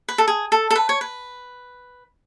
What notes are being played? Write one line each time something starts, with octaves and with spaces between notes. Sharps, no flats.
B4
A4
G#4
A4
A4
B4
C#5
B4